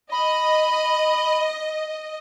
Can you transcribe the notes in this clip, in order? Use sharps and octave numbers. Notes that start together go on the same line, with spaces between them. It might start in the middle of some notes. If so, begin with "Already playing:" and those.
D#5 B5